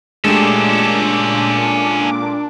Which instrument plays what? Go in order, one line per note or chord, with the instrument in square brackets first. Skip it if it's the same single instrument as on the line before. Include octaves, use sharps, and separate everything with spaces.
[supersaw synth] A#2 D6 [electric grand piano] G#3 A3 G4 [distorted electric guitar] C#4 A4 [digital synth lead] D4